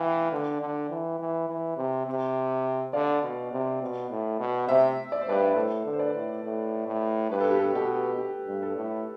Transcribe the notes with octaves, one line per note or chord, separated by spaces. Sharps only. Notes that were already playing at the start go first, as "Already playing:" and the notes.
Already playing: E3 F5 G5
D3
D3
E3
E3
E3
C3
C3
D3 D5 F5
B2
C3
B2
A2
B2
C3 C5 E5
D5
C5
G2 B4 D5
B4
A2 A4 C5
D3
C5
B4 D5
A2
A2
A2
G2 B4
A4
G4
A4
B2 G4
G4
G2
A4
A2